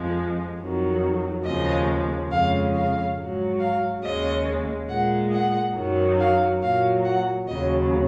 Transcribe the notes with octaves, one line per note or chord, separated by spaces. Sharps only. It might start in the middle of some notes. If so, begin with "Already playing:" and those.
Already playing: F2 F3 G#3
F2 D#3 F#3
D#2 C#3 F3 G#3 D#5
F2 C#3 G#3 F5
F5
G#2 F#3
F5
D#2 C#3 G#3 D#5
A#2 G#3 F#5
F#5
F#2 D#3 F#3
F5
A#2 F#3 F5
F#5
D#2 C#3 F#3 D#5